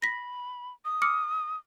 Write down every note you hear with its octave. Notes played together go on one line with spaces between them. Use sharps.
B5 A#6 B6
D#6
D6 F6 C#7